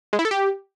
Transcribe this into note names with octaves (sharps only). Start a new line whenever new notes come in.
G#3
E4
A4
G4